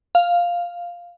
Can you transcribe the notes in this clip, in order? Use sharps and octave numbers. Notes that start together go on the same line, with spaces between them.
F5